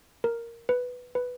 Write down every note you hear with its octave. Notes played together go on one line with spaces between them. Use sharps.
A#4
B4
B4